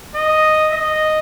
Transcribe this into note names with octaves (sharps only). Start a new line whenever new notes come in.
D#5
D#5